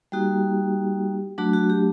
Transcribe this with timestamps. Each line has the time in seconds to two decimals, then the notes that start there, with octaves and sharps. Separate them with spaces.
0.12 G3 A#3 D#4 F#4 G4
1.38 F#3 A3 D4 F#4
1.53 F#4
1.70 G4